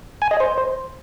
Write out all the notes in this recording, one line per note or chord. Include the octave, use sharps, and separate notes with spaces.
G#5
D#5
C5